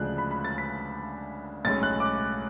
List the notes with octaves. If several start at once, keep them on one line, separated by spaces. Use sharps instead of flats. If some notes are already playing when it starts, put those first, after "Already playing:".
Already playing: D2 C#3 F3 G#3 D4 F#6
B5
B5
A6
B6
B1 A2 G#3 C#4 A6
F#6
D6